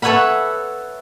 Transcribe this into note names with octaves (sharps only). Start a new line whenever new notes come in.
A4 B4 C#5 E5 F#5 B5